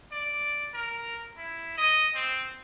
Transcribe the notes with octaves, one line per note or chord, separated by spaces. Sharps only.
D5
A#4
E4
D#5
C4